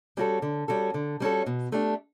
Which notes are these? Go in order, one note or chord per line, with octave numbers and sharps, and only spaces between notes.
G3 C#4 F#4 A4
D3
G3 C#4 F#4 A4
D3
G3 C#4 F#4 A4
B2
A3 D4 G4